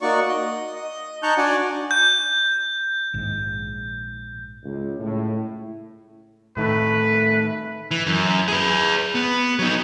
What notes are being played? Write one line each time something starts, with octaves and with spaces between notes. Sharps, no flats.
A#3 D#4 F#4 D5 C#6
D#5
D#5
D#4 A5 A#5 C#6 F#6 G6
D4 F#4 D5 F#5 G#5
G6
A#1 G#2 D#3
C#2
A2
A2 D#3 A3 B4
E3
F#2
G#4 B4
B3
F#3 D#4